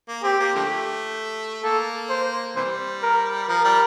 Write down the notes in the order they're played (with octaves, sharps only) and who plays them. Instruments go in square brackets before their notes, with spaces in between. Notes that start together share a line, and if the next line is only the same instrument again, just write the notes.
[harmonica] A#3
[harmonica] C4 [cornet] G4
[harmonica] A#3
D3 F3 A3
[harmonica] A#3 [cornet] A4
[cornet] C5
[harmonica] C3 E3 G3 [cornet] C5
[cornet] A#4
[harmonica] F3 [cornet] A#4
[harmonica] G3